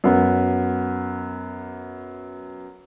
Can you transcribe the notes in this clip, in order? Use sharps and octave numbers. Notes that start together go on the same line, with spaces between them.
F#2 B3